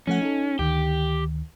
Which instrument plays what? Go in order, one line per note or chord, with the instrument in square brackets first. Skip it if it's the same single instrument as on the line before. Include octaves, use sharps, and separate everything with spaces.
[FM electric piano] F3 A3 F#5 [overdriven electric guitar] C#4
[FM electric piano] D#4 A4
[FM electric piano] D2 D#3 [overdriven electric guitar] G4